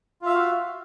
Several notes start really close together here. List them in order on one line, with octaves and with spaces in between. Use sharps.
F4 E5 F5 F#4